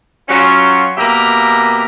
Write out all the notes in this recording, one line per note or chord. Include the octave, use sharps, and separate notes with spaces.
F#3 C#4 F4
B2 A#3 G4 E5 A#5